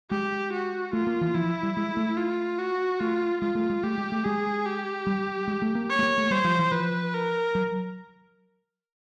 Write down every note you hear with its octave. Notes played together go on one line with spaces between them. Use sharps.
G#3 G4
F#4
A3 F4
A#3
E3
F3 E4
G3
G#3
A3
F4
F#4
A3 F4
G#3 F4
A3
G#3
A3 G4
G#3
A3
G#3 G#4
G4
G3
G#3
A3
A#3
C#5
A3
A#3
A3
G3 C5
F3
E3
F3 B4
A#4
F#3